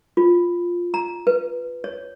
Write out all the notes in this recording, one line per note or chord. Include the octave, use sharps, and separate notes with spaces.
F4
A#5
B4
C#5